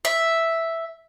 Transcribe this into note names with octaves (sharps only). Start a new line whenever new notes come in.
E5